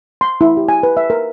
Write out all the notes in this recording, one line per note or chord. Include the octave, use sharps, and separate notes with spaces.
C6
E4
G4
G#5
B4
E5
A#4